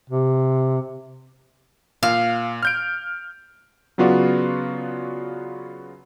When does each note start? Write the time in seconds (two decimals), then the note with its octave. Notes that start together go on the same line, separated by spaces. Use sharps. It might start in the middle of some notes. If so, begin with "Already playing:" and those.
0.10 C3
2.03 A#2 F5
2.63 F6 G6 D7
3.98 C#3 F#3 B3 F4 F#4 D5